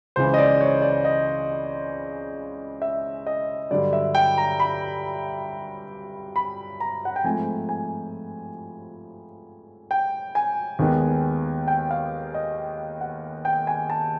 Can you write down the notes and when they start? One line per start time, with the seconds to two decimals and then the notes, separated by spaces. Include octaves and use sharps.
0.16 C#2 C#3 E3 C5
0.34 D#5
0.38 D5
0.60 C#5
0.82 D5
1.05 D#5
2.82 E5
3.27 D#5
3.71 G2 D3 F#3 D5
3.93 E5
4.15 G5
4.37 A#5
4.60 B5
6.36 B5
6.80 A#5
7.05 F#5
7.16 G5
7.24 G#2 F3 A3 C4 G#5
7.69 G#5
9.91 G5
10.35 G#5
10.79 D#2 D#3 G#3 B3
11.68 G5
11.91 F5
12.34 D#5
13.01 F#5
13.45 G5
13.67 G#5
13.90 A5